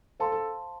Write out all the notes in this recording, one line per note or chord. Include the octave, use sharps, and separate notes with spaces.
A4 C5 F5 A5 C6
A4